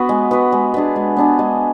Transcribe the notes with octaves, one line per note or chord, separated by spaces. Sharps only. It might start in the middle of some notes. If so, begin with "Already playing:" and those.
Already playing: B3 F#4 B4
G#3
B3 F#4 B4
G#3
B3 D4 G#4
G#3
B3 D4 G#4
G#3